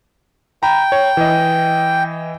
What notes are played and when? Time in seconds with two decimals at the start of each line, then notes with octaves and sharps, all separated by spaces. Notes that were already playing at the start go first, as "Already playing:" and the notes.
0.63 G5 A#5 B5
0.92 C#5
1.17 E3 D#5